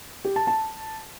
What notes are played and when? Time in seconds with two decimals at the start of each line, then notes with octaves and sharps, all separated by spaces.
0.25 G4
0.36 A5
0.47 A5